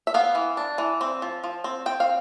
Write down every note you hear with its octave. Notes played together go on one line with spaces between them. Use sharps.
E5
B3 F5
E3
D4
E3
C4
F3
F3
C4
C4 G5
F5